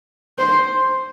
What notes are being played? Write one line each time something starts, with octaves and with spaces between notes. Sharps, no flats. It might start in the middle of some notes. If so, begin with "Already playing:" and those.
C5